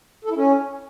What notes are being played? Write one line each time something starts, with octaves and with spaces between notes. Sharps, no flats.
A4
E4
C#4